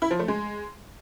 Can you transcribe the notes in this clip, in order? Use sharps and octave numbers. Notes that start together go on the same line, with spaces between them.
E4
F3
A3
G#3